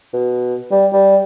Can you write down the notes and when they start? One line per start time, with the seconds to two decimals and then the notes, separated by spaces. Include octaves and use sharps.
0.13 B2
0.71 G3
0.92 G3